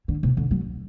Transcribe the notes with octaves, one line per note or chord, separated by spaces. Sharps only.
D3
C3
D3
F#3